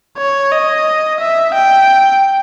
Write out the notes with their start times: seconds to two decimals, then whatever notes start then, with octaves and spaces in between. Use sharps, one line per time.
0.17 C#5
0.52 D#5
1.20 E5
1.54 G5